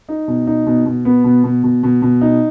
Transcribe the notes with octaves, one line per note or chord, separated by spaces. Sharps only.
D#4
B2
D#4
B2
B2
B3
B2
B2
B2
B2
B2
D#4